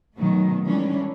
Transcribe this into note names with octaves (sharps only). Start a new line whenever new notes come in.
B2 D#3 F#3 A3
D#3 E3 G3 G#3 C#4 D4